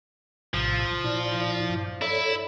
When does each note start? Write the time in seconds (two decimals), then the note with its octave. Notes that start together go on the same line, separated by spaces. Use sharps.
0.54 A#1 A2 C3 F3
1.04 A#2 E4 D5
1.70 G2
2.02 E4 A4 C#5 D5